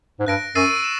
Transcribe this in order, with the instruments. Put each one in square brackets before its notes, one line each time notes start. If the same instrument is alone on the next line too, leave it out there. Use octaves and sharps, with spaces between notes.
[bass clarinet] G#2
[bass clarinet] G2 [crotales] F#6 A#6 D7
[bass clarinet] F#2 [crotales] C#6 E6 A6 C7 D#7
[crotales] E7